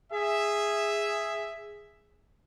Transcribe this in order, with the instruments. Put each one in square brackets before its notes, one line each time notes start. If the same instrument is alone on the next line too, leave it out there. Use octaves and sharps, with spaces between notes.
[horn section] G#4 E5